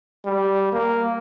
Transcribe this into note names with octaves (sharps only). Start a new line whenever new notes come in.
G3
A#3